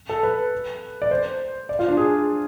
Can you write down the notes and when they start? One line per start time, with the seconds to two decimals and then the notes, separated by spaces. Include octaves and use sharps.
0.09 A4
0.23 B4
1.02 D5
1.11 C5
1.69 D5
1.79 F4
1.88 D4
1.97 G#4